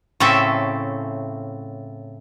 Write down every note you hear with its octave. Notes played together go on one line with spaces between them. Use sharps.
A2 C#3 C4 A4 E5